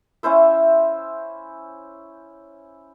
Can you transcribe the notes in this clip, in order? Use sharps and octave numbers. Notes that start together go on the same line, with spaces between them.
C#4 E4 C5 E5